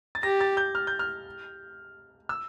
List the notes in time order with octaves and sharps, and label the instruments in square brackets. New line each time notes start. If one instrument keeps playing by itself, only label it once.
[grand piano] A6
[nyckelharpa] G4 [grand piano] A#6
[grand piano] A6
G6
F6
G6
F6
E6